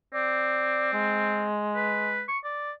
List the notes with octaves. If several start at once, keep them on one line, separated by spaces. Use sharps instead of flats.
C4 D5
G#3
B4
C#6
D5